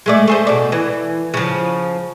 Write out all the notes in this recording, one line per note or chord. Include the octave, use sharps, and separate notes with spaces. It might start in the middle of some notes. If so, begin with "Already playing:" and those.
G#3 A3 D5
A3 G#4 C5
B2 D5
E3
C#3 F3